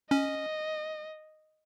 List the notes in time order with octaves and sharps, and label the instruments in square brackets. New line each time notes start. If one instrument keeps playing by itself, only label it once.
[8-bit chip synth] C#4 [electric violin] D#5